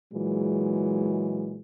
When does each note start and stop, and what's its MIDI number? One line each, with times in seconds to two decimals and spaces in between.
0.13 1.61 46
0.13 1.61 52
0.13 1.61 54
0.13 1.61 56